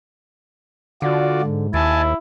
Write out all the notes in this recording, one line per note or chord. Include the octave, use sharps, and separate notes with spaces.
D3 F4 F#4 D5
G#2
D#2 E4 G#5 A5